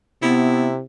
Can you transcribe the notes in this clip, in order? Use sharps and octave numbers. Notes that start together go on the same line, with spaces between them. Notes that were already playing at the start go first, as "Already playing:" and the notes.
C3 B3 E4